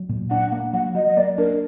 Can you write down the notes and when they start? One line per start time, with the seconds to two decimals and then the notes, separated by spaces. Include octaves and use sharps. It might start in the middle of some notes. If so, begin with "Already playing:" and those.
Already playing: F#3
0.09 A#2
0.31 D4 F#5
0.52 A#3
0.73 F#3 F#5
0.95 F#3 D#5
1.07 D#5
1.17 A#3 D5
1.38 D4 A#4